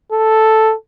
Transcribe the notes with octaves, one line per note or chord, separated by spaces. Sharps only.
A4